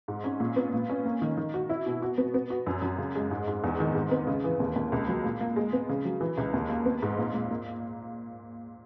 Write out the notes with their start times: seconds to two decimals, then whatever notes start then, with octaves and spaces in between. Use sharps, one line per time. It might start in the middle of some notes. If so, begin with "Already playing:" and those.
0.08 G#2
0.24 C#4
0.40 A#2
0.56 B3
0.73 A#2
0.89 C#4
1.05 A#3
1.22 D#3
1.37 D#3
1.54 F#4
1.69 E4
1.86 B2
2.02 F#4
2.18 B3
2.34 B3
2.50 F#4
2.67 F#2
2.82 F#2
2.98 C#3
3.15 G#3
3.31 G#2
3.48 G#2
3.64 E2
3.80 D#3
3.95 G#2
4.11 B3
4.27 C#3
4.44 E3
4.60 D#2
4.76 D#2
4.92 C#2
5.08 F#3
5.25 A#2
5.41 A#3
5.56 G#3
5.73 B3
5.89 C#3
6.05 F#3
6.21 E3
6.38 C#2
6.53 D#2
6.69 A#3
6.85 B3
7.02 G#2
7.18 A#2
7.34 A#2
7.51 A#3